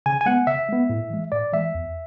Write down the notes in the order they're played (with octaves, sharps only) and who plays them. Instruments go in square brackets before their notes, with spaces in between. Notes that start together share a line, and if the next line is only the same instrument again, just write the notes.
[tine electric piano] C#3 G#5
G#5
G#3 B3 F#5
C#3 E5
G#3 B3
A2
E3 G#3
A2 D5
E3 G#3 E5
E2